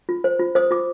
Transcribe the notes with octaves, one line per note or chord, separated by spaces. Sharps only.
F4
C5
F4
C5 D#6
F4 D6